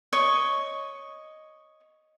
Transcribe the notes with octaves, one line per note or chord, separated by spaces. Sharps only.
C#5 D#5 C#6